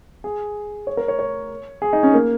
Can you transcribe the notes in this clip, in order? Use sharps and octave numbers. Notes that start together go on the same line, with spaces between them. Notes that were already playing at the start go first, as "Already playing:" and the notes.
G#4
C#5
A#4
C#5
C#5
G#4
D#4
C#4
A#3